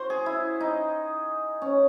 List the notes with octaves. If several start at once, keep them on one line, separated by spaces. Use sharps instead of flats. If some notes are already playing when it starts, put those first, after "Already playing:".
Already playing: F#4 C5
G#4
E4
D#4
C#4